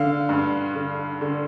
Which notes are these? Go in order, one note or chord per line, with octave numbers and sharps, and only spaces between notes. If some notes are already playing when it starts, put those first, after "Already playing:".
Already playing: D3 F5
G2
D3
D3